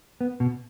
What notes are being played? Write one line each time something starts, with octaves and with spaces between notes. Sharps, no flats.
B3
B2